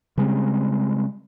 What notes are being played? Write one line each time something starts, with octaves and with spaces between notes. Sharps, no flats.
C#3 G3 G#3 C4